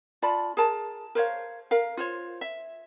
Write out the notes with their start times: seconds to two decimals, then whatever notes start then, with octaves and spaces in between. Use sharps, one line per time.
0.22 F4 D5 A5 B5
0.57 G#4 A#4 A5
1.15 A#4 C5 C#5 F5
1.71 A#4 F5
1.97 F4 C5 C#5
2.41 E5